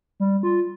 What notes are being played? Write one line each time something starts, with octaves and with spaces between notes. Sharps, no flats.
G3
F4